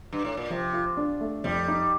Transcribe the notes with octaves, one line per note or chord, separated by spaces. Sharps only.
G2
A2
A#2
C3 F3
F4
D4
A3
F2 G3
D#4